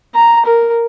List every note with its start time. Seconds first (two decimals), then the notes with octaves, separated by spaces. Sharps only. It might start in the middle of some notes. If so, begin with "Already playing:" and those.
0.15 A#5
0.45 A#4